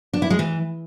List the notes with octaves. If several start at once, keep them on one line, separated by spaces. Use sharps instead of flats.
D4
E4
G#3
E3